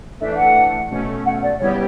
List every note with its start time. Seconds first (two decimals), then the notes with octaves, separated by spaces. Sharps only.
0.20 E3 A3 D4 A4 E5
0.38 F#5
0.90 B2 A3 C#4
1.26 F#5
1.43 D5
1.60 C#3 G3 B3 E4 G4 C#5